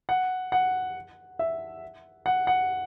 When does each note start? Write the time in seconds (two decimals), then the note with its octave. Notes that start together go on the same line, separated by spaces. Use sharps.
0.09 F#5
0.52 F#5
1.39 E5
2.26 F#5
2.47 F#5